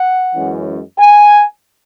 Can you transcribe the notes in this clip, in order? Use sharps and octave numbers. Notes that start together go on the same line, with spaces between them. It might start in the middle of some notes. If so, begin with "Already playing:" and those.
Already playing: F#5
F#2 E3 G#3 C#4
G#5